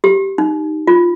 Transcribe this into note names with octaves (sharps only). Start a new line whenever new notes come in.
G4
D#4
F4